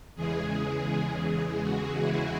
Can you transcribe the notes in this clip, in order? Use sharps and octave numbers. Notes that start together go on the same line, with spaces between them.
E2 C#3 E3 G#3 G#4
F#4
E4